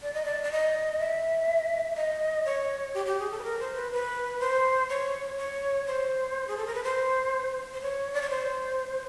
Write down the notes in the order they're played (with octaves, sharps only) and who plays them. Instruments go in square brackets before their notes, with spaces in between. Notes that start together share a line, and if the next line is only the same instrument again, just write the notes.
[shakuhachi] D5
D#5
D5
D5
D#5
E5
D#5
C#5
G4
G4
G#4
A4
B4
A#4
C5
B4
B4
C5
C#5
C#5
C5
G#4
A4
A#4
B4
C5
C5
C#5
D5
C#5
C5